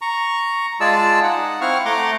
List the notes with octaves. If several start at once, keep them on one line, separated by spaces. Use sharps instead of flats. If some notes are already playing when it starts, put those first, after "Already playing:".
A#5 C#6
G#3 F4 G#4 D5 A5 E6
D#4 F#5
C4 E4 F5 F#5 C#6 F6
A3 F#5 A#5 C6 D6